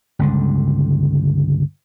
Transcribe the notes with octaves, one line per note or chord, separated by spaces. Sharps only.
G1 C#2 D3